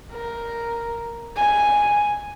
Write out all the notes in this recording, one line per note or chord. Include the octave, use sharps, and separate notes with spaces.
A#4
G#5